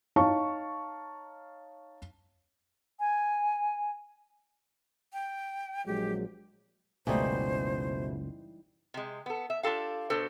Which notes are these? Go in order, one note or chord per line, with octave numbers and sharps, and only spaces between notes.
D#4 C#5 F5 A5 C#6
G#5
G5
A#1 F#3 G#3 G4
F#1 C#2 B2 E3 G3 A3 D#4 C5
C3 G#3
B3 A4
E5
D4 F4 G4 A4 F5
B2 D4 A4 C5